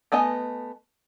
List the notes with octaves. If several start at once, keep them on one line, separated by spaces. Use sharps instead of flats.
A3 B3 D#5 G#5